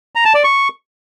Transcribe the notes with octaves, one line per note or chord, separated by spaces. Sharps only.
A#5
A5
D5
C#6